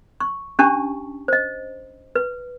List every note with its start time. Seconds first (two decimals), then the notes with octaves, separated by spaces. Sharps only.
0.20 C#6
0.59 C#4 D4 G4 A5 C#6
1.28 C5 D#5
2.16 B4